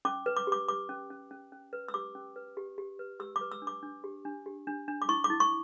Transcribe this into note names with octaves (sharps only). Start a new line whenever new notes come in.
C#4 D6
B4
D6
G4 D6
B4 D6
C#4
C#4
C#4
C#4
B4
E6
G4 D6
C#4
B4
G4
G4
B4
G4 E6
D6
B4
E6
D4
D6
D4
G4
D4
G4
D4
D4
D6
E4 C#6
D6
E4
C#6